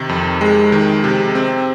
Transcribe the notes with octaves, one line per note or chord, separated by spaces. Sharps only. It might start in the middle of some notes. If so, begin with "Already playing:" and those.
Already playing: C3 D#3
F2
G#3
D#3
C3
C4